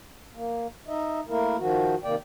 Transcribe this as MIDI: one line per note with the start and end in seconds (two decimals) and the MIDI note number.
0.35 0.67 58
0.88 1.20 63
0.88 1.20 75
0.88 1.20 76
1.28 1.57 57
1.28 1.57 58
1.28 1.57 64
1.28 1.57 70
1.58 1.95 51
1.58 1.95 53
1.58 1.95 66
2.04 2.15 48
2.04 2.15 51
2.04 2.15 58
2.04 2.15 74
2.04 2.15 79